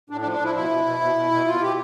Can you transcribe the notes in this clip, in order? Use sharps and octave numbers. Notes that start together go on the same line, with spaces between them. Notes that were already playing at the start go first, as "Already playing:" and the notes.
A2 D4
D4
F3
D4
F3 E4
B2 E4
B2
B2
B2
B2
B2
B2 F4
B2 G4